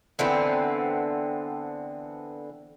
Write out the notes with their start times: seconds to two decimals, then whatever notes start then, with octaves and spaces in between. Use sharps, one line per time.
0.19 D3 E3 B3 C4